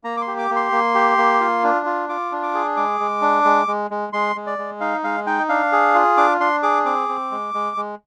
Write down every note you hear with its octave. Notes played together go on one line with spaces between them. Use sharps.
A#3 A#5
D6
C6
G4
D6
A#3
C6
A#3
G4
A#3
F4
D4
F4
F4 D6
D4
D6
G#4
G#3 D6
G#3
D4
G#3
G#3
G#3
G#3 C6
G#3
D5
G#3
D#4 F5
G#3 F5
D#4 G5
D4 F5
G#4
F4
D4 D6
D4 C6
G#4 D6
C4 D6
C4
G#3
G#3
G#3